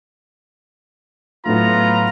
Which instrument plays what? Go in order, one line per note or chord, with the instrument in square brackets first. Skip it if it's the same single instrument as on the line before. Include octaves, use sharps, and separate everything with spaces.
[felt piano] A2 F#3 A3 [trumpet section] B3 F4 A#5